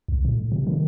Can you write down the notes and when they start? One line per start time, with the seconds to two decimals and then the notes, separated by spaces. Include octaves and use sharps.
0.08 C2
0.25 A2
0.52 C3
0.67 D#3